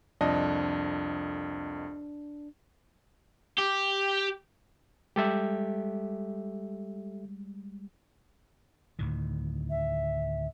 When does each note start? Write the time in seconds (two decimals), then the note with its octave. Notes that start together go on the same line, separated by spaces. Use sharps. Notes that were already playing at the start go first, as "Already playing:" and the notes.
0.21 C2 F2 D4 D#5
3.58 G4
5.16 G3 G#3 G4 A4 E5
8.99 D2 A2 D#3
9.70 E5